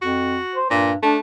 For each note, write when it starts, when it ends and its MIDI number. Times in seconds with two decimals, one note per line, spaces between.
0.02 0.38 41
0.02 0.58 66
0.56 0.69 72
0.70 0.96 43
0.70 0.91 46
1.03 1.18 57
1.03 1.17 62